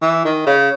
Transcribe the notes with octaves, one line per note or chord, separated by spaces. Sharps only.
E3
D#3
C#3